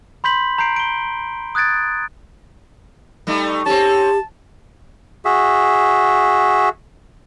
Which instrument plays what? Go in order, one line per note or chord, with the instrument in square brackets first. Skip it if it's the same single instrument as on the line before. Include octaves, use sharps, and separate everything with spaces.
[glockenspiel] B5 C6 G6 B6 F#7
A#5 G6 C7 D7
D7 G7
D#6 F#6 G#6 A6 D7
[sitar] G3 A3 D#4
[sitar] C4 C#4 [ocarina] G4 [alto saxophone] A5
[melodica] F#4 G#4 E5